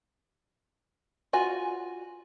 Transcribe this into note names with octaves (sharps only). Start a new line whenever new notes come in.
F4 F#4 G#5